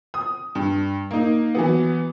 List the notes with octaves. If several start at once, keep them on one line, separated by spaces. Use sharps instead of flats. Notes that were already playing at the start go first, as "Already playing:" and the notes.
D#6
G2
A#3 D#4
E3 F#3 B3